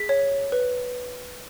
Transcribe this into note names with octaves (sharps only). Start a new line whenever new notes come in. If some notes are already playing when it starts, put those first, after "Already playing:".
Already playing: G#4 B6
C#5
B4